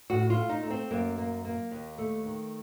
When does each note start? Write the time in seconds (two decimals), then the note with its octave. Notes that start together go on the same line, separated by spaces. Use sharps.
0.10 A2 F#4
0.30 F4
0.36 A3
0.49 D#4
0.63 A3
0.70 C4
0.91 F#2 A#3
1.18 A#3
1.45 A#3
1.71 D#2
1.98 A3
2.25 D#3